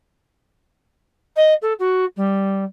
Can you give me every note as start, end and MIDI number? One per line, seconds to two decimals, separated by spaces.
1.36 1.54 75
1.62 1.73 69
1.79 2.05 66
2.16 2.64 55